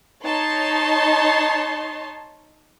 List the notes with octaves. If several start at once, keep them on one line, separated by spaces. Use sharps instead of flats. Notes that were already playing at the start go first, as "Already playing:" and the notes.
D#4 C#5 A5 C6